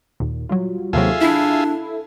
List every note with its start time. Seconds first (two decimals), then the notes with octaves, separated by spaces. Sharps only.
0.20 D#2 A#2
0.49 F#3 G3 F4
0.93 D#2 C3 F#3 F4 G#4 A4 E5
1.21 D4 E4